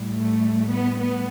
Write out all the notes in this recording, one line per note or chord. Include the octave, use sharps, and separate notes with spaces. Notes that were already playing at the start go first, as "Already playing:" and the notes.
Already playing: A2 G3
A3
B3
B3